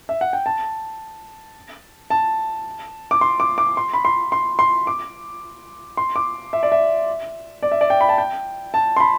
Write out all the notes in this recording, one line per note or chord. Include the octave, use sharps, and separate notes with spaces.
E5
F#5
G5
A5
A5
D6
C6
D6
D6
C6
B5
C6
C6
C6
D6
C6
D6
E5
D5
E5
D5
E5
D5
G5
B5
A5
G5
A5
C6
B5